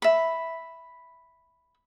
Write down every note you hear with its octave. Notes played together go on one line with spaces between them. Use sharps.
E5 B5